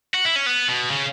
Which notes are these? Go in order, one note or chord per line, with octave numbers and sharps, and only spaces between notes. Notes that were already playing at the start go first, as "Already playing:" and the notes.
F#4
E4
C#4
B3
B2
C#3